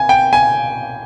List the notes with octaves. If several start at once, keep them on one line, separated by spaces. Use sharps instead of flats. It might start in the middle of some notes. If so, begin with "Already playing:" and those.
Already playing: G#5
G5
G#5